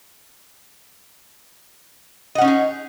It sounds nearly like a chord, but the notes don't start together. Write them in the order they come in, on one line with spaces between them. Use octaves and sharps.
D#5 F#5 C#4 D#4 G#4